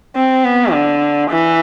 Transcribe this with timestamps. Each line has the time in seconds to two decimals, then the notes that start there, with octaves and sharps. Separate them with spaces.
0.16 C4
0.44 B3
0.72 D3
1.30 E3